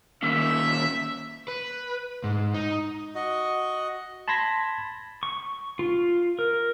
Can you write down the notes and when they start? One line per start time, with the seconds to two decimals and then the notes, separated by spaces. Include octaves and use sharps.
0.23 D#3 A#3 C#4 E5
1.48 B4
2.24 G#2
2.54 D#4
3.15 F#4 D#5
4.28 A5 B5 C6 G#6 A#6 B6
5.23 C#6
5.79 F4
6.39 A#4